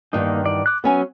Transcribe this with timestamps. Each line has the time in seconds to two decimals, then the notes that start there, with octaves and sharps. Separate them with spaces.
0.13 E2 G2 D#3 A#3 D#4
0.46 D5
0.66 D6 F#6
0.84 F#3 B3 C#4 G#5